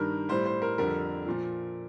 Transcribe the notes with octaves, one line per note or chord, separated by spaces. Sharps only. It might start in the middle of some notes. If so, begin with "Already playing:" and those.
Already playing: G2 D#3 G3 A#4
A2 G3 C5
C5
A#4
F2 D3 G3 A#4
A#2 F3